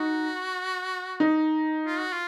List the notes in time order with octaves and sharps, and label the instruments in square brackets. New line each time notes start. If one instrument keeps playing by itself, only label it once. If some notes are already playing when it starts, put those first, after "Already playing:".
Already playing: [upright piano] D#4 [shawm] F#4
[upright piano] D#4
[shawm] F4
F#4
F4